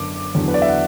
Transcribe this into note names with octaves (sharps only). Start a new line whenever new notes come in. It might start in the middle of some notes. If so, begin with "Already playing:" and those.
Already playing: F#2 D3 B3 D4 D6
E2 D3 F#3
B4
D5
E5
F#5